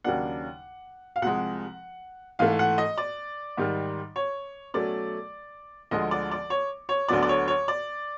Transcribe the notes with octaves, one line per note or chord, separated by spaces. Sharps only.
D#2 C#3 F#3 A#3 D4 F#5
F5
C2 C3 F3 G#3 F#5
G#2 E3 A3 F5
F#5
D#5
D5
G#2 D#3 G3
C#5
B2 F#3 A3 C#4 D5
D2 D3 F3 G#3 D#5
D5
D5
C#5
C#5
D2 D3 F#3 B3 D5
D5
C#5
C#5
D5